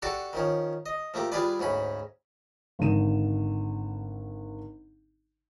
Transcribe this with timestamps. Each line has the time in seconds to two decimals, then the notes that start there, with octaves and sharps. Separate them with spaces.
0.02 D4 F#4 G4 A4 A5 D6
0.33 D#3 F3 C#4
0.86 D#5
1.14 F3 A3 A#3 G4
1.32 G3 D4 F4 G#4 B4 D5
1.59 D2 G#2 C#4 B5
2.79 G#1 D3 D4 D#7 E7